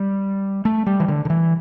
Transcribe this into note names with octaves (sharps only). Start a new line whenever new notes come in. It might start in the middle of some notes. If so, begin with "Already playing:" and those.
Already playing: G3
A3
G3
E3
D3
D3
E3